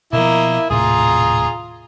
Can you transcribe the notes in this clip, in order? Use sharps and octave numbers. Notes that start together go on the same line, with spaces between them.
B2 F3 A#3 E4 D#5
D#1 A2 C3 F4 G#4 A#5